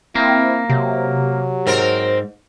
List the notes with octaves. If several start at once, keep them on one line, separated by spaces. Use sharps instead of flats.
A#3 C4 E4
C3 F#3
G#2 C4 A#4